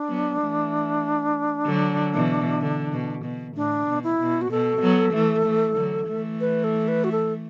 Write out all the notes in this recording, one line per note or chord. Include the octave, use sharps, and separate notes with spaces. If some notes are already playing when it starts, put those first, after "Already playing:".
Already playing: D4
F#3 B3
E3 A3
D3 F#3
B2 E3
D3
B2
B2
A2 D4
B2
E4
B2
F#4
B2 A4
F#3 B3
E3 A3
E3 A3
D3 F#3
E3 A3
B4
A4
B4
F#4
A4